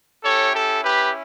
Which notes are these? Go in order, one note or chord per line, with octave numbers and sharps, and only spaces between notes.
C#4 E4 G4 A4 C#5
A4
G4 B4